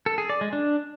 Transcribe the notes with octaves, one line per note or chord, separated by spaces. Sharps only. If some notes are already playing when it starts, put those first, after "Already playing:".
A4
G#4
D5
G#3
D4